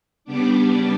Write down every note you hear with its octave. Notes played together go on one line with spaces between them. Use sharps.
C#3 G3 B3 D4 D6